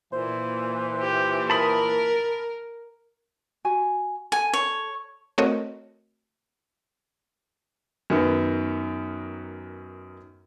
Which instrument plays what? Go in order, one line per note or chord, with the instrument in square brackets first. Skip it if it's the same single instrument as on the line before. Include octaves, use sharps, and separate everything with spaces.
[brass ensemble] A#2 E3 [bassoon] C5
[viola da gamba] G4
[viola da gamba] A#4 [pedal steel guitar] A5 B5 D#6
[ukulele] F#4 G#5
[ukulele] A4 [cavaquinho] G#5
[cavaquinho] C#5
[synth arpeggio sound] A3 C4 F#4 A#4 C#5 D#5
[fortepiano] F#2 D#3 B3